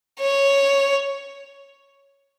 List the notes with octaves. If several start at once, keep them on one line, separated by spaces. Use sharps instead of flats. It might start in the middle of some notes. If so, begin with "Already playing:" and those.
C#5